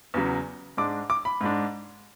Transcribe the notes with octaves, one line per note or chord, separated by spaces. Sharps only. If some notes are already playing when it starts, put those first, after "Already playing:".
E2 C#3 F#3
G#2 G#3 D4 D6
D6
B5
G#2 G#3 D4